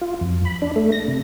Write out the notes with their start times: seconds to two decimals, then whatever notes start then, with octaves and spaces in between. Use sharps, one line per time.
0.01 F4
0.21 F2
0.45 B5
0.62 D4
0.76 A3
0.92 A#6
1.08 C3